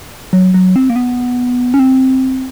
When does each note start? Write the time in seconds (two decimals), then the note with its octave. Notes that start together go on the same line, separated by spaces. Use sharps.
0.33 F#3
0.54 F#3
0.76 C4
0.90 A#3
0.96 B3
1.74 C#4
1.79 C4